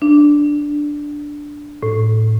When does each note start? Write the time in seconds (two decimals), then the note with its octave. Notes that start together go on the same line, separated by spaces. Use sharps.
0.02 D4
1.83 A2